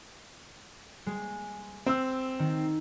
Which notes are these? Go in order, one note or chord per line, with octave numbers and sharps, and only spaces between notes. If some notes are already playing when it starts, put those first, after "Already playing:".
G#3
C4 E6
D#3